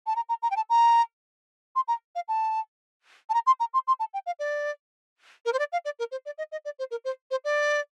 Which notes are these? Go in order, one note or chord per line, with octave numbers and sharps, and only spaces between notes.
A5
A#5
A#5
A#5
G5
A5
A#5
C6
A#5
F5
A5
A5
A#5
C6
A#5
C6
C6
A5
G5
F5
D5
A#4
C5
D5
F5
D5
A#4
C5
D5
D#5
D#5
D5
C5
A#4
C5
C5
D5